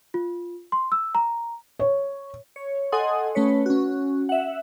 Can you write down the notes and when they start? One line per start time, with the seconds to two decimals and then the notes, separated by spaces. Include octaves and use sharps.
0.14 F4
0.72 C6
0.92 E6
1.15 A#5
1.79 C#5
2.56 C#5
2.92 A4 D#5 F#5 G#5 C6 D#6
3.35 A3 C#4 B4 C#5
3.66 C#4 F#4
4.29 E5 F#5